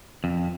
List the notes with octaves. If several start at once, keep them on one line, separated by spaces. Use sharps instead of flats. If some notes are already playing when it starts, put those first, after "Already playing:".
F2